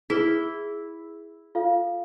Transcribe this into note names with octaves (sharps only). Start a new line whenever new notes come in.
E4 G#4 B4 B6 G7
F4 A4 F5